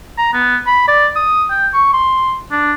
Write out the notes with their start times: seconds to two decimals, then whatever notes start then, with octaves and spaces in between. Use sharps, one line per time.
0.18 A#5
0.33 B3
0.67 B5
0.88 D5
1.16 D#6
1.50 G5
1.73 C#6
1.93 C6
2.51 D4